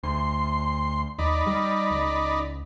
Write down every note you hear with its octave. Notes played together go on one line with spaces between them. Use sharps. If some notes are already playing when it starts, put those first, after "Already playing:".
D2 C6
D#2 D#4 D5 B5
G3
C#2